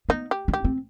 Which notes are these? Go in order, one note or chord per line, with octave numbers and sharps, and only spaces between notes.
B3 D#4
G4
D4
G4
C4